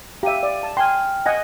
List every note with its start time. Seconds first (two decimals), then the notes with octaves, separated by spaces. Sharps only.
0.23 G4 E5 F5 D#7
0.43 D5
0.63 A5
0.77 G5 G#5 C6 F6
1.26 D#5 F#5 G#5 A#6